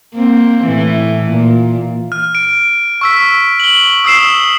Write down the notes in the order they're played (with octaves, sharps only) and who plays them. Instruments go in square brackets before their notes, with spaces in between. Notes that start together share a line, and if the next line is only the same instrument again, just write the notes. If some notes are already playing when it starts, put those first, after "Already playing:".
[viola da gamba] A#3 C4
A2 E3
A#2
[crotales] F6
D7
C#6 E6 B6
F#7 G7
D#6 E6 C7 E7